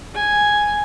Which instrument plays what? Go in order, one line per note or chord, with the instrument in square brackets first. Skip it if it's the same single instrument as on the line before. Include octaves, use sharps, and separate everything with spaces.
[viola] G#5